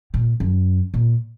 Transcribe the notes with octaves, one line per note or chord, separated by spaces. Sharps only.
A#2
F#2
A#2